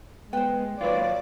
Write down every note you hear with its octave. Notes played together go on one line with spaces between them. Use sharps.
G#3 B3 C5 G5
D#2 F#3 F4 B4 D5